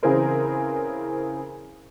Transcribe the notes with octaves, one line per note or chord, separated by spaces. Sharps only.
C#3 E3 C4 G#4 A#4 C5